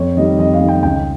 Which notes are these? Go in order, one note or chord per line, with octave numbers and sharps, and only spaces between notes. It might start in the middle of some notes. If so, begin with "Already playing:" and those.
Already playing: F2 C#5
D#3 G3 D#5
F2 D#5
F5
D#3 G3
G5
C#2 G5